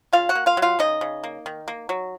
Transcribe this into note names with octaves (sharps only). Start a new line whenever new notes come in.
C#3 F4 F5
F#4 F#5
A#3
F4 F5
F#3
F4 F5
C#3 D#4 D#5
C#3
A#3
D#3
A#3
F#3